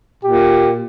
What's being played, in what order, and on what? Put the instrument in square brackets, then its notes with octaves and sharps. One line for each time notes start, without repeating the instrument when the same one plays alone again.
[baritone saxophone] A#2 [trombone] G4